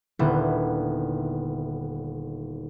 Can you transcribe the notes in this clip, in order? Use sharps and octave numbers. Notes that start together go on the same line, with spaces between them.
D#1 D3 B3 E4 G6